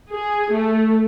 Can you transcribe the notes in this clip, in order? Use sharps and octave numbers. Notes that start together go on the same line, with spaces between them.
G#4
A3